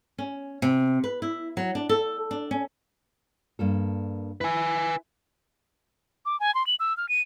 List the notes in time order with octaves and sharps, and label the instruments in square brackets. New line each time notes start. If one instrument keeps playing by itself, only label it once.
[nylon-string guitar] C#4
C3
B4
E4
F#3
D4
A4
D4
C#4
G2 A#3 A4
[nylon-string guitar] E4 [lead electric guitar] B4 G#5
[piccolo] D6
G#5
C6
F#7
E6
F6
D#7